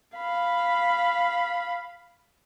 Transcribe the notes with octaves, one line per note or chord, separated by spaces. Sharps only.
F5 B5